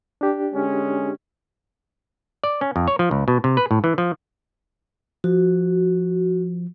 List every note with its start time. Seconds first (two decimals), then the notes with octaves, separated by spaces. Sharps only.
0.21 D4 G4
0.53 D3 G#3 C#4
2.44 D5
2.61 C#4
2.76 F2
2.88 C#5
2.99 F3
3.11 C#2
3.28 B2
3.44 C3
3.57 B4
3.71 A2
3.84 E3
3.98 F3
5.24 F3 F#4